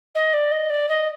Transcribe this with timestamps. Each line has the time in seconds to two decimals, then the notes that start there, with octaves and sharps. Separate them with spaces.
0.14 D#5
0.33 D5
0.51 D#5
0.69 D5
0.88 D#5